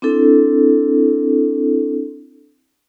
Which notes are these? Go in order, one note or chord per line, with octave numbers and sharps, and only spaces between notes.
C4 D4 E4 A4